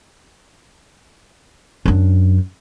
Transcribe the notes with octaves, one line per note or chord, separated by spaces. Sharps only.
F#2 D4